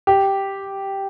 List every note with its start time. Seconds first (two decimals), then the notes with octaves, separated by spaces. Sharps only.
0.07 G4